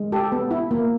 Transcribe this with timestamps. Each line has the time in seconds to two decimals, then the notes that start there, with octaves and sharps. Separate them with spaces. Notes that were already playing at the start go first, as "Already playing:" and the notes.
Already playing: G#3
0.12 G4 A4
0.32 B3
0.51 E4
0.71 A#3